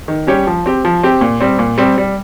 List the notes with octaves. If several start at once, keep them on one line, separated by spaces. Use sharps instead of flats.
D#3
G3 C#4 G4 C#5
F3
C4 G4
F3
C4 G4
A#2
G3 C4
A#2
G3 C4
G3